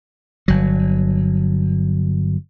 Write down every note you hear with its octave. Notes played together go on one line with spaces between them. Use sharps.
G1 F#3